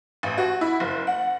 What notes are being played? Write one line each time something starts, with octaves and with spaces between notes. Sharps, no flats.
A1
F#4
E4
F#1
F#5